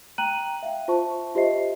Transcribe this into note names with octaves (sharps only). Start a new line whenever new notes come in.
G5 A#5 F#6 D#7 F#7
E5 F5 G5
F4 C5 E5 A5 C#6
F4 G4 C5 D#5 E5 C7